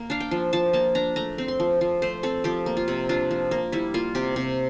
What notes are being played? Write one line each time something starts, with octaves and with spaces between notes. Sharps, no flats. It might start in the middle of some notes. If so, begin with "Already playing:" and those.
Already playing: A#3
D4 F5
G5
F3
F3 A5
A#3 A5
D4 A#5
A3 A#5
C4
C6
F3
F3
A3 C5
C4 A4
F3 G4
A#3
F4
C3
D4 F4
F3
A#3
G3 E4
A#3 F4
C3 G4
C3